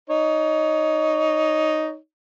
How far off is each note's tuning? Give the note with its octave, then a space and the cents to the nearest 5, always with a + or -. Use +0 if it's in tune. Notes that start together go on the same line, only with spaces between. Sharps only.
D#4 +0 C#5 +25